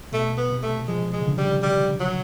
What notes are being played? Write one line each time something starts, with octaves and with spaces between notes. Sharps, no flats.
B2 A3
B3
C3
A3
F3 G#3
G#3
C#3
D3
G3
G3
F#3